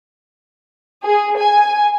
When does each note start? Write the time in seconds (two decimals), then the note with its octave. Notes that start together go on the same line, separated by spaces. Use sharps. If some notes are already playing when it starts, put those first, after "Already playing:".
1.04 G#4
1.37 G#5